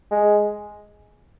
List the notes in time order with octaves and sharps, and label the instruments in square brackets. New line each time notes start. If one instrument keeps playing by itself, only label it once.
[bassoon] G#3